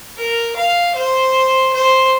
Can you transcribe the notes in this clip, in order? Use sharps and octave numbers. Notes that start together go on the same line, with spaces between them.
A#4
F5
C5
C5